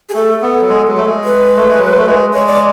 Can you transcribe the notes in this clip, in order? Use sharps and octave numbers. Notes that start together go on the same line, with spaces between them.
G#4
A3 A4
B3
F#3
G#3
F#3
A3
G#3
B4
A3
G#3
F#3
A3
G#3
G#3 C#5
D5